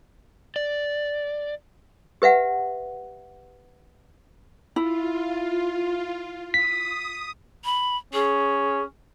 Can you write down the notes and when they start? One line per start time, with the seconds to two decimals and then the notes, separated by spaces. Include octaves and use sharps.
0.56 D5
2.22 G4 B4 E5 F#5
4.76 E4 F4
6.54 D#6 B6
7.65 B5
8.13 C#4 G#4